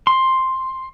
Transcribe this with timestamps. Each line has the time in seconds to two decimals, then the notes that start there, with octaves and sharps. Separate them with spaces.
0.07 C6